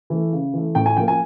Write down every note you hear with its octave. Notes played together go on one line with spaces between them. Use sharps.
E3 A3
C#3
E3 A3
A2 G5
G#5
F3 A#3 G5
G#5